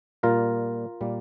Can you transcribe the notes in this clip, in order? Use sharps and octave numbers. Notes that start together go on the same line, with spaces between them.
A#2 G3 A#3 F4 A#4
A#2 G3 A#3